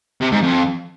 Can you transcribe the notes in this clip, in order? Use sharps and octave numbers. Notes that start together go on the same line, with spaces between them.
C3
G#2
F2